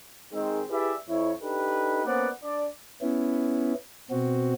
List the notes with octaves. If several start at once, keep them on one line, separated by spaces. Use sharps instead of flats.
D#3 G#3 C4
E4 G4 G#4 B4 D5 E5
F2 E4 C#5
D4 D#4 G4 A4 B4
A#3 B3 C#4 C5 D5 F#5
D4 D5
B3 C#4 E4
B2 C4 F#4